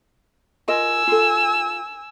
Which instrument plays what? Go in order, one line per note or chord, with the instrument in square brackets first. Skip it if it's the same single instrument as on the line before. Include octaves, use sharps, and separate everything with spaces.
[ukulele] F4 A#4 D#5 [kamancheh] G#5 E6
[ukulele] F4 A4